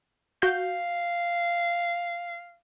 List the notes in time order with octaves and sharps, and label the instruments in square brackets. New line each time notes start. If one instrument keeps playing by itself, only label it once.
[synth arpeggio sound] F#4 G6 [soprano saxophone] F5